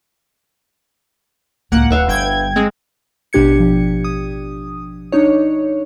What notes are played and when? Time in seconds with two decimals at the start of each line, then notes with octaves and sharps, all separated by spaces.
1.72 C#2 A2 A#3 F#5
1.90 D1 B4 E5 F5
2.07 G1 G3 G5 G#6
2.56 G#3 C4
3.33 A1 B2 D4 G4 G#6 C#7
3.60 F3
4.04 D#6
5.12 D4 D#4 C#5